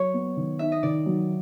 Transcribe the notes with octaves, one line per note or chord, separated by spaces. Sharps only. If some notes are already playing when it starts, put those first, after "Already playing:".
Already playing: F#3 C#5
B3
D#3
D#4 E5
D#5
D#3 D5
F#3